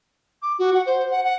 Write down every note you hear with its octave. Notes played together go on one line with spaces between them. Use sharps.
D6
F#4
F#5
C5
F#5
F#5